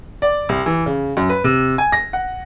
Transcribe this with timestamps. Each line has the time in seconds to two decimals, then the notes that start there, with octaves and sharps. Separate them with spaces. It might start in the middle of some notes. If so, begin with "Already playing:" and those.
0.22 D5
0.49 C2
0.66 E3
0.86 C#3
1.17 F#2
1.29 B4
1.44 C3
1.78 G#5
1.92 A#6
2.13 F#5